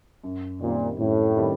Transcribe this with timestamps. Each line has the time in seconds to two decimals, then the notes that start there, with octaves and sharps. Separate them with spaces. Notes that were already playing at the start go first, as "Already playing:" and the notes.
0.24 F#2
0.61 A#2 D#3 G3 C4
0.99 F#2 A2
1.37 D#3 G3 C4